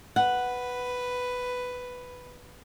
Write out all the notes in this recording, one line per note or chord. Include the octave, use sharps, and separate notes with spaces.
B4 F#5